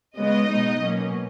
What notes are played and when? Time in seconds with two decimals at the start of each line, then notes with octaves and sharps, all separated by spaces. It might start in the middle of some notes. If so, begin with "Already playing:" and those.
0.18 C#3 G#3 B3 D#5
0.49 B2 G#3 B3 D#4
0.80 B2 F#3 A#3 C#4